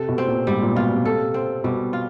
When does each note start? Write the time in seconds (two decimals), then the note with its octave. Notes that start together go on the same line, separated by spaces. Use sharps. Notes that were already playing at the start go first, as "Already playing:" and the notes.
Already playing: C3 A4
0.09 B2
0.18 C4
0.27 A#2
0.47 G#2 G3
0.62 A#2
0.76 B2 F4
0.91 C3
1.05 A4
1.34 C4
1.64 B2 G3
1.93 F4